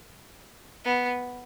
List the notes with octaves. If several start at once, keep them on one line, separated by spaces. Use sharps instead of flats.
B3